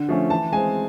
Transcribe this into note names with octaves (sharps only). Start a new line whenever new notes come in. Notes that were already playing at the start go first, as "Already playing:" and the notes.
Already playing: D3
F3 A3 C#4
E3 A5
G#3 C4 G#5